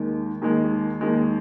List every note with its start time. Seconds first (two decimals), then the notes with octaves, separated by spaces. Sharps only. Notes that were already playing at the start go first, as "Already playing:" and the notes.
Already playing: D#2 D#3 G#3
0.42 D#2 D#3 G#3
1.01 D#2 D#3 G#3